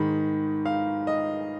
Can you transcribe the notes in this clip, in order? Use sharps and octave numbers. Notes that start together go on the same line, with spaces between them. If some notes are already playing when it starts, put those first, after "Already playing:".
Already playing: G#2 D#3 B5
F5
D#5